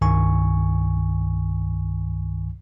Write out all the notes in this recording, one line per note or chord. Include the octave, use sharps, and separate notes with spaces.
C2 G2 D#3 G#5 C#6